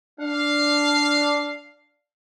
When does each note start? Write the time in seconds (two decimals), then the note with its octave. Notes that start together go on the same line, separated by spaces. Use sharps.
0.20 D4 F5